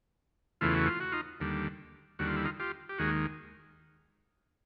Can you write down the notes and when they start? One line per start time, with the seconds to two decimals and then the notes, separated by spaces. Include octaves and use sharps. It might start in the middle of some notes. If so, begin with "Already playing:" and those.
0.61 E2 C#3 E3 A3 F4
0.74 F#4
0.86 F4
1.00 F#4
1.12 D#4 F4
1.40 D#2 D3 G3
2.19 D#2 D3 G3 F#4
2.27 F4
2.37 E4
2.45 D#4 F4
2.60 F4 G4
2.89 G4
2.98 D#2 D#3 G#3 F#4 G#4